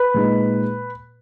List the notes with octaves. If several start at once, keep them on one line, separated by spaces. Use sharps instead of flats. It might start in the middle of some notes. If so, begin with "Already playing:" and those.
Already playing: B4
A#2 G#3 D#4